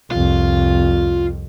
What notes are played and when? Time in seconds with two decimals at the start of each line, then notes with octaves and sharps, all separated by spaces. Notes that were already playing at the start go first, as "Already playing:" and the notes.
0.11 C2 F2 F4